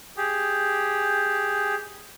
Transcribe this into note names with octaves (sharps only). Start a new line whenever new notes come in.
G4 G#4